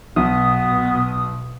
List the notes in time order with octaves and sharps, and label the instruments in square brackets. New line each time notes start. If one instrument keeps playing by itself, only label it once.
[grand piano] B1 [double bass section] B2 [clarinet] B3 [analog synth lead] D#6